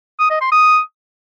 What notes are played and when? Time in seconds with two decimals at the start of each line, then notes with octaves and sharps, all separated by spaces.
0.19 D#6
0.30 D#5
0.41 C6
0.52 D#6